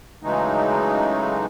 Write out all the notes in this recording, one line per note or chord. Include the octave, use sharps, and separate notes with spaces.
C#3 E3 F#3 G#3 A3 D#4